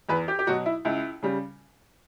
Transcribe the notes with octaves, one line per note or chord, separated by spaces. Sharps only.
E2 B4
G4
G4
B2 F#3 F#4
E4
C#2 E4
C#3 G3